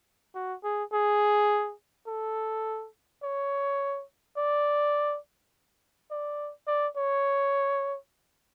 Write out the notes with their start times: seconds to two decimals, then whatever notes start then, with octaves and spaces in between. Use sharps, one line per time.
0.35 F#4
0.64 G#4
0.93 G#4
2.07 A4
3.23 C#5
4.37 D5
6.11 D5
6.67 D5
6.97 C#5